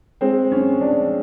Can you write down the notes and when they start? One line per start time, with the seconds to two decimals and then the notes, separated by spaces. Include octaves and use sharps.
0.21 G#3 C4
0.51 F#2 C#4
0.81 F3 D4